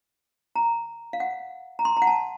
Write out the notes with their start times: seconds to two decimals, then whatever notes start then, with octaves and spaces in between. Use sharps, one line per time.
0.56 A#5
1.13 F5
1.20 F#5
1.79 A#5
1.85 C6
1.97 A#5
2.02 F#5
2.07 A5